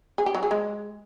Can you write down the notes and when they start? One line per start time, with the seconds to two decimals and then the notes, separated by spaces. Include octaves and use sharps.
0.18 G#4
0.26 G4
0.34 F#3
0.43 G#4
0.51 G#3